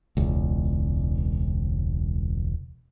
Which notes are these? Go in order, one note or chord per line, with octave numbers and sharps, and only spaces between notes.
E1 C#2